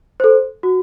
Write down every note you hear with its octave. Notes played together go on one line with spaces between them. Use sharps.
A4 C5
F#4